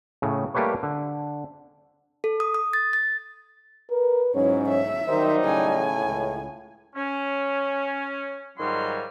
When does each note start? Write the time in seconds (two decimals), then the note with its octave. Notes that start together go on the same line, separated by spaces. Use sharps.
0.22 A2 C#3
0.54 G3 A3 A#3 G4 B4 C#5
0.83 D3
2.24 A4
2.40 D#6
2.54 D#6
2.73 A6
2.93 A6
3.91 A#4 B4
4.35 B1 G#2 F#3 C#4 E4 C#5
4.69 E5
5.08 D#3 F#3 G3 D#4 C5
5.45 A2 C#3 G#5
6.03 C#2
6.96 C#4
8.58 G#2 D#3 F#3 G3 F4 C6